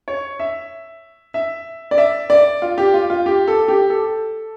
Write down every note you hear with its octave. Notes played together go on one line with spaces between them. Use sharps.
C#5
E5
E5
D5
E5
D5
F4
G4
F4
F4
G4
A4
G4
A4